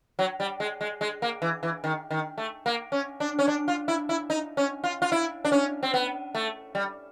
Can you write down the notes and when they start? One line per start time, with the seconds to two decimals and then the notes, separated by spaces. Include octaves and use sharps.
0.19 F#3
0.40 G3
0.60 G#3
0.81 G#3
1.01 G#3
1.22 A#3
1.42 E3
1.63 E3
1.84 D#3
2.11 D#3
2.38 A3
2.66 A#3
2.92 C#4
3.20 D4
3.39 C#4
3.48 D4
3.68 F4
3.88 E4
4.09 E4
4.30 D#4
4.57 C#4
4.84 F4
5.02 F4
5.12 E4
5.45 D4
5.52 C#4
5.83 C4
5.94 B3
6.35 A3
6.75 G3